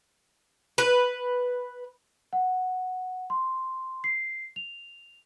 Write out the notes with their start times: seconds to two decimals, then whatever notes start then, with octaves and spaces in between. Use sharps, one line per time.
0.78 B4
2.33 F#5
3.30 C6
4.04 C7
4.56 F7